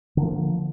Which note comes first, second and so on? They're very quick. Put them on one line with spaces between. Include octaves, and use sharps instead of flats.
D3 A#3 F3